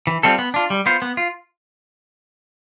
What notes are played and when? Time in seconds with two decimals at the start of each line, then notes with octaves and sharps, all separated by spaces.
0.07 E3
0.23 G3 C4 F4 A4
0.39 B3
0.54 D4 F4
0.70 G3
0.86 B3 F4 C5
1.02 B3
1.17 F4